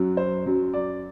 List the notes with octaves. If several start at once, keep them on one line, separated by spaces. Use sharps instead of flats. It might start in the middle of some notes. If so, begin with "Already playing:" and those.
Already playing: F#2 F#3
C5
F#2 F#3
D5